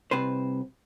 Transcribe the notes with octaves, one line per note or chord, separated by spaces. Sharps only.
C2 C3 B4 C5